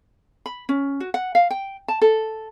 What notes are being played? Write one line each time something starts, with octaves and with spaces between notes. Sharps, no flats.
B5
C#4
F#4
F#5
F5
G5
A5
A4